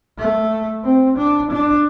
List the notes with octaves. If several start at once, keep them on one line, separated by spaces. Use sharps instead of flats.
A3
C4
D4
D4